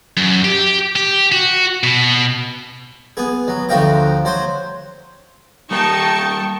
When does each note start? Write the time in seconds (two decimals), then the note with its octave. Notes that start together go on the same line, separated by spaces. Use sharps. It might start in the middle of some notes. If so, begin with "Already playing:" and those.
0.17 F#2
0.44 G4
0.96 G4
1.32 F#4
1.83 B2
3.17 B3 G#4
3.48 F#3
3.69 D2 F3 F#4 F5 G5 A#5
4.25 F#3 C5 C6
5.71 G3 A#3 D#4 G5 A5 C#6